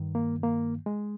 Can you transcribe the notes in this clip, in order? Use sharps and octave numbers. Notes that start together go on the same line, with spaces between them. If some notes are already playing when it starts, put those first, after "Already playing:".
Already playing: G2 D#3
A#3
A#3
G#3